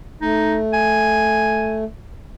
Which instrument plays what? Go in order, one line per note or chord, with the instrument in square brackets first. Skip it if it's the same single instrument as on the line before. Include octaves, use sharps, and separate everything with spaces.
[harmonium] A3 [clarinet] D#4
[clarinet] G#5